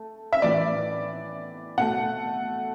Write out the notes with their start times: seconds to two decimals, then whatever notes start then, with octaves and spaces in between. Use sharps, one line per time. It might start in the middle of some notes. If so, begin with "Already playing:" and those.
Already playing: A3
0.33 E5
0.42 A2 E3 B3 D5
1.78 B2 A3 F#5